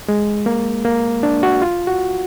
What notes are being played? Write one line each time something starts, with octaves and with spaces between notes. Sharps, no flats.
G#3
A#3
A#3
D4
F#4
F4
F#4